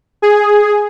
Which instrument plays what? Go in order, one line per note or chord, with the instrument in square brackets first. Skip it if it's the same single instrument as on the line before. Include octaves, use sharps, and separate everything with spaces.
[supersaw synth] G#4